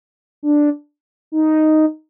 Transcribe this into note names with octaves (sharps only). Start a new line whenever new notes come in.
D4
D#4